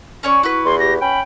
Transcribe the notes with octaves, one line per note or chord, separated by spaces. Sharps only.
C#4 C#5 D5
E4 F#4 B4
E2 C6
G4 A#6
C#4 G5 B5